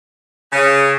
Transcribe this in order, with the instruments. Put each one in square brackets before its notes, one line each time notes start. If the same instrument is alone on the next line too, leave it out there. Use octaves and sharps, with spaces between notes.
[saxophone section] C#3